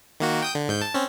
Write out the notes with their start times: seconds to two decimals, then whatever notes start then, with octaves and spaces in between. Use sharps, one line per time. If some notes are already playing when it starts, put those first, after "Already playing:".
0.20 D#3 A#3 F#4
0.42 G5 D#6 G6
0.55 D3
0.69 G#2 G6
0.81 A5
0.94 C4 C#4